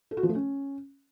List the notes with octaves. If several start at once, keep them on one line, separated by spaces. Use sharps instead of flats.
A4
F#4
F3
A3
C#4